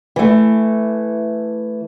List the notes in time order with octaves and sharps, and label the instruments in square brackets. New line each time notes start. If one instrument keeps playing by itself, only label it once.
[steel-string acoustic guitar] E3 A3